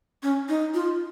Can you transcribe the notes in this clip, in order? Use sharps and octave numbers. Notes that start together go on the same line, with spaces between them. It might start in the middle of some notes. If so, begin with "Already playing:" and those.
C#4
D#4
F4